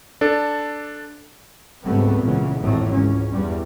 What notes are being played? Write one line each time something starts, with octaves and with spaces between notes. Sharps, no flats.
D4 A4
C#2 G#2 G3 A3 B3 C4
A#2 C#3 E3 G#3 B3
G#1 F2 A2 E3 F#3 A3
C#2 G#2 C#4
E2 G2 E3 G3